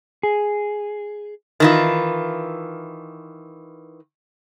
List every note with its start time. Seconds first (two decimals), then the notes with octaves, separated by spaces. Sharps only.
0.23 G#4
1.60 D#3 E3 F4